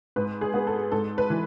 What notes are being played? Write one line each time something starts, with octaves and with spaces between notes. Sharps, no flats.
G#2 B4
G#4
B3
A4
G#2 A4
B4
E3